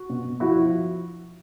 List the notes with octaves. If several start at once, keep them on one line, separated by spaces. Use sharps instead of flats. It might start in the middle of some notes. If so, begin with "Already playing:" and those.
Already playing: F#4
B2
B2
F3 E4 F#4
F3